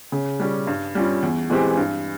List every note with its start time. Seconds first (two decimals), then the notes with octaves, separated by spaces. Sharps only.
0.12 C#3
0.40 G3 C#4 G4
0.67 G2
0.95 G3 C#4 F4
1.22 E2
1.50 E3 G#3 C4 G4
1.77 G2